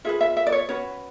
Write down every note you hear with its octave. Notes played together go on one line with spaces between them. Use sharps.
F4 G#4 B4 E5
E5
E5
D5
C#5
C#4 F#4 B4 C#5